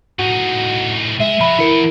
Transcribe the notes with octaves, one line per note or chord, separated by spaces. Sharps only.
A2 D#4 F#4
G#3 E5
F3 F#4 B5
E3 E4 A#4 F#5 D7